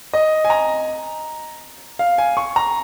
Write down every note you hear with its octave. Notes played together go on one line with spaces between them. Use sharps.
D#5
G#5
A#5
F5
G#5
C#6
A#5